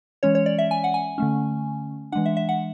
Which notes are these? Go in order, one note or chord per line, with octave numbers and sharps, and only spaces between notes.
E3 G#3 C#4 C#5
C#5
D5
E5
G#5
F#5
G#5
D3 A3 C#4
E3 G#3 D4 F#5
E5
E5
F#5